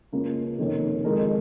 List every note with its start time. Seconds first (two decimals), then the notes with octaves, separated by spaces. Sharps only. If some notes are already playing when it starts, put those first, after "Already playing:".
0.12 C#2 C#3 A#3 F4
0.58 F1 F2 D#3 A#3 C#4
1.04 F2 D#3 G#3 D#4 A#4